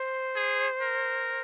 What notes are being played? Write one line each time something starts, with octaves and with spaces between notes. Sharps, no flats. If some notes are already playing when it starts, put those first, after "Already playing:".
Already playing: C5
G#4
A#4